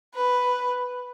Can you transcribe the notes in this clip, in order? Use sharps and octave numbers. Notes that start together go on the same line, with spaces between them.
B4